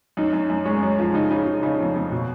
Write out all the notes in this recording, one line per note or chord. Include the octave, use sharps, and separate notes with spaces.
F#2 D#4
F#2
F#2
G#3 C#4
F#2
F3
C#3 D#4
C#3
C#3
C#3 D#4
F2
F2
B2